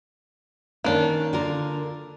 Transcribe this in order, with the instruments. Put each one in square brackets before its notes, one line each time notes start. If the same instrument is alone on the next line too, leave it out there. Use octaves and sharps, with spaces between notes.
[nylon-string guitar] D#3 C#4 [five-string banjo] A#3 D4
[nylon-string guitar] D3 F4 A#4